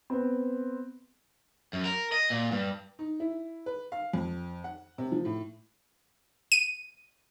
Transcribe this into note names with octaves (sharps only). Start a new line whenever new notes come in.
B3 C4
F#2
A#4
D#5
A#2
G2
D#4
E4
B4
F5
F2
F#5
C3
F3
A2
D#7